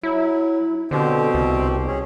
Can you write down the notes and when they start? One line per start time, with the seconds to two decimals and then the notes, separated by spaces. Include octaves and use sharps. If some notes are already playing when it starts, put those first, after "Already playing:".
0.03 F#3 E4
0.91 B2 D3 C4 G4 C5
1.34 C2
1.87 C#4 G#4